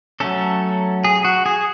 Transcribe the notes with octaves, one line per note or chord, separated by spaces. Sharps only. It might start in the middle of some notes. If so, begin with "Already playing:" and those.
F#3 A3 C#4 A4
G#4
F#4
G#4